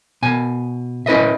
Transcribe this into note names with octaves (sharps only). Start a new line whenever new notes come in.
B2 G#5
C#4 E4 B4 D#5 E5